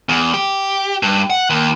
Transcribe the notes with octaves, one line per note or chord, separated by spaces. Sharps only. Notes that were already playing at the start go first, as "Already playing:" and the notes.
E2
G4
G2
F#5
D#2